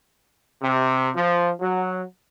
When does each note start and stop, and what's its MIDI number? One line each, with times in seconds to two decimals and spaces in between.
0.62 1.10 48
1.15 1.51 53
1.60 2.02 54